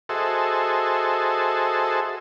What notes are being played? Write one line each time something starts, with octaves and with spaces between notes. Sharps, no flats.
F#4 G#4 A4 C5 D#5 E5